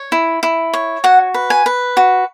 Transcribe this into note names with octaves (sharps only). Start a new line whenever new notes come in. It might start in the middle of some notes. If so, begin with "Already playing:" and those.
Already playing: C#5
E4
E4
C#5
F#4 F#5
B4
G#5
B4
F#4